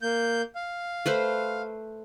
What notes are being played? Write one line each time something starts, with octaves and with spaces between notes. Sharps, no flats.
A#3 G6
F5
A3 B4 C5